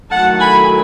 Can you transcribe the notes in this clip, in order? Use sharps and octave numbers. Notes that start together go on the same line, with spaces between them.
D#3 F#3 A3 E4 F#5 A5
G#5 B5